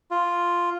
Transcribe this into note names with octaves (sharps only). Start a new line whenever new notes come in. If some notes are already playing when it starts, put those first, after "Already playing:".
F4